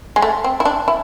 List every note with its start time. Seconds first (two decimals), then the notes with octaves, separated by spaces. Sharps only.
0.16 G#3
0.22 A3
0.44 C4
0.60 E4
0.65 D4
0.88 E4